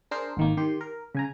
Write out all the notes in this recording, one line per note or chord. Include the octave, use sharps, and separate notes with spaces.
D4 G#4 A#4 C5
G#1 D#3 A#3
D#3 G4 C6
A#4
C#3 G#5 A#5